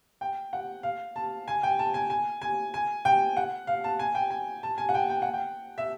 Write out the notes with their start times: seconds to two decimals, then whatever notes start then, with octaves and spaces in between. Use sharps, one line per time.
0.21 G5
0.53 F#5
0.83 F5
1.16 A5
1.48 G#5
1.63 G5
1.79 A5
1.94 G#5
2.10 G#5
2.42 G#5
2.74 G#5
3.05 G5
3.37 F#5
3.67 F5
3.84 A5
3.99 G#5
4.15 G5
4.30 G#5
4.63 A5
4.78 G#5
4.89 F#5
4.94 G5
5.10 G5
5.22 F#5
5.34 G5
5.78 E5